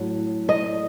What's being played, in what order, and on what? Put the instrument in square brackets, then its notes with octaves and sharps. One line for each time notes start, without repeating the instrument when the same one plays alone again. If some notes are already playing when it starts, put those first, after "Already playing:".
Already playing: [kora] A2 F#3
D#5